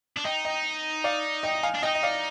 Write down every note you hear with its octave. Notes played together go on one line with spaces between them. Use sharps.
D4
D#4 D#5 G5
D#5 G5
D5 F5
D#5 G5
F5 G#5
D4
D#4 D#5 G5
D#5
D5 F5